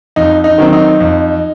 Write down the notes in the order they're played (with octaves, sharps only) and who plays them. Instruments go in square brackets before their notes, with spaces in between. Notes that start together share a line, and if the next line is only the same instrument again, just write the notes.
[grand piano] F2 D#4
D#4
D#3 F#3 C4
D#4
F2